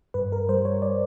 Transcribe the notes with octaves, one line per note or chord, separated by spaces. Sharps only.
G2 B4
A#4
G3 C5
C#5
D5